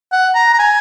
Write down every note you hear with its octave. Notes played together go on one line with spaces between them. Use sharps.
F#5
A#5
A#5
G#5